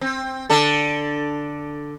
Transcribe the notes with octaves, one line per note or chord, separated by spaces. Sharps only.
C4
D3 D4 A4